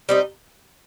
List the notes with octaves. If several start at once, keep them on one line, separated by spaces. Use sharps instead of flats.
G3 C4 D#4